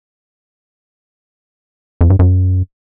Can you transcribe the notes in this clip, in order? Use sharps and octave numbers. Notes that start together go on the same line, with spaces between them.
F2
G2
F#2